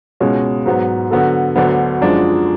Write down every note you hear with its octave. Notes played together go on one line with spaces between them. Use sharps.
C#2 B2 G#3 C#4
G#2 F#3 B3
D3 F#3 B3 F#4 A4
D2 D3 F#3 B3 D4
F#2 F3 G#3 D4 F#4